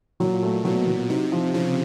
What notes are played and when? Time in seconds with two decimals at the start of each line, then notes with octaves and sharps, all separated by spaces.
0.20 A#2 F#3
0.43 A3
0.64 B2 F#3
0.87 F#3
1.09 C3 D#4
1.32 F3
1.54 C#3 F3